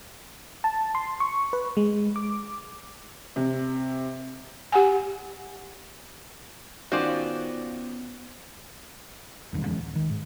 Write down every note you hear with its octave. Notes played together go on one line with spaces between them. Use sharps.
A5
C6
C#6
B4
G#3
D6
C3
G4 F#5 G#5
D#3 B3 C#4 F4 F#4 C5 D5
B1 F2 D#3 G3
F2 E3 G#3 C#4
D1
D#3
G#2